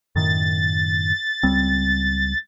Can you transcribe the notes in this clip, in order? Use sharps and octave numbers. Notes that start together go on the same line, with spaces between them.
F#2 A2 D#3 A6
C#2 G3 C4